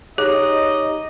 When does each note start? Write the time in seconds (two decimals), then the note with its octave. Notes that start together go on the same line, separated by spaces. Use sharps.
0.18 D#4 G4 G#4 C#5 D#5 D6